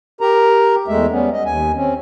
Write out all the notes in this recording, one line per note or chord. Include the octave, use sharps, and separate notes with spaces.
G4 A#4 A#5
E2 G#3 A3 E5
G3 B3 C#4
D#5
D#2 G#5
C4 C#4